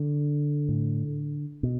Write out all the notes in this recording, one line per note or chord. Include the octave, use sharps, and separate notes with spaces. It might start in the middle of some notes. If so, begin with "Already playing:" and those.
Already playing: D3
A2
B2